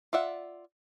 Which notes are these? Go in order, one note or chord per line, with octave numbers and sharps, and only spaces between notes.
F4 D5 E5 F#5